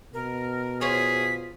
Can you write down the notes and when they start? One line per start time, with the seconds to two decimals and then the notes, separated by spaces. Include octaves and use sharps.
0.14 B2 A#4
0.81 F4 G#4 C5 C#5 B6